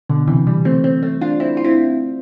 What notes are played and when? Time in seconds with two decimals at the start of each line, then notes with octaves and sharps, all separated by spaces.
0.09 B2 D3
0.27 C3 E3
0.47 E3 G3
0.65 A3 C4
0.84 A3 C4
1.03 A3 C4
1.21 D4 F4
1.40 C4 E4
1.57 F4
1.65 C4 E4